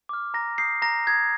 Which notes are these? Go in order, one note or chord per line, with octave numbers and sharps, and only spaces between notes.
D6 F6
A#5 A#6
D#6 G6 C7
A#5 A#6
D#6 G6 G#6